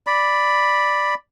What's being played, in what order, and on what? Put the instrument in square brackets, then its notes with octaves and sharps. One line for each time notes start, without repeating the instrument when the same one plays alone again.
[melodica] D5 B5